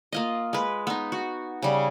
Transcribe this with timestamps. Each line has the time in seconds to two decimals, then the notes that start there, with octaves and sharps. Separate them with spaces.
0.12 A#3 F4 D#5
0.53 G#3 B4
0.87 B3 D#4
1.12 F#4
1.62 C#3 G3